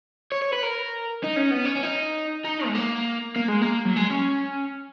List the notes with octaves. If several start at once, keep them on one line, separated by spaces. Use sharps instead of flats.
C#5
C#5
B4
A#4
D#4
C#4
B3
C#4
C#4
D#4
D#4
G#3
A#3
A#3
G#3
A#3
F#3
G#3
C#4